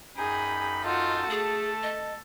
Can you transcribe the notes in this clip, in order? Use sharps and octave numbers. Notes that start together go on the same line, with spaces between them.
F#2 D#4 G#4 G5 B5
F4 F#4 A4 D#5
A3 G#4 A5
D#5